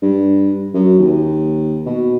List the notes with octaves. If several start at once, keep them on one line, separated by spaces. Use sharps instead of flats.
G2
F#2
D#2
B2